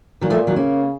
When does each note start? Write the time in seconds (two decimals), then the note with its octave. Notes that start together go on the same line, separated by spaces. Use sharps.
0.21 A#2 D#3 F#3
0.30 F3 A3
0.47 D#3 F#3
0.56 C#3 A#3 C#4